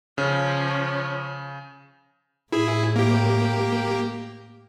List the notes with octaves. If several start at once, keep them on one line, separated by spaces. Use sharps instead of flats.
C#3 F3 C#4
A2 E4 G#4
A#3 G4